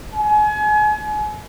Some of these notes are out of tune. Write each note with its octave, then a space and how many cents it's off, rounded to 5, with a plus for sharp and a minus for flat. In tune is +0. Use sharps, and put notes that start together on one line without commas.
G#5 +35